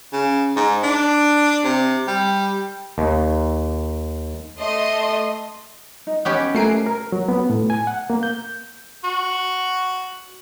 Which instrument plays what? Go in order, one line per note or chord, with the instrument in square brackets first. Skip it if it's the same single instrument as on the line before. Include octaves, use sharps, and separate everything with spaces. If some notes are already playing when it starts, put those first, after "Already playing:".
[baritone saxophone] C#3
G#2
D4
C3
G3
[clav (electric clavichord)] D#2
[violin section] A3 D#5 C6
[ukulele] D#4
[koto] B3 C#4 G4
[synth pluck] A3 C7 D7 [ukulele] F#4 A#4 G#5
[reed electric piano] A#4
F#3
B3
A2
G#5
F#5
A#3
G6
[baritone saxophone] F#4